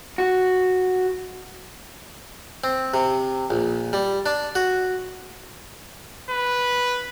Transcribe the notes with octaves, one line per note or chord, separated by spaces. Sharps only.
F#4
C4
C3
A#1
G3
D4
F#4
B4